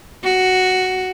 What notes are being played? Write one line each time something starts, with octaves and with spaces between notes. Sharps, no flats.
F#4